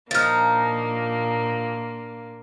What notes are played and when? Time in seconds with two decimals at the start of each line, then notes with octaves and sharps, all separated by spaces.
0.11 A#2 F3 A#3 D4 D#4 F6 A6